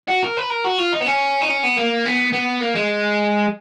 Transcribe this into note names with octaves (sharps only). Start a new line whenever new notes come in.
F#4
A#4
B4
A#4
F#4
F4
D#4
B3
C#4
D#4
C#4
B3
A#3
B3
B3
A#3
G#3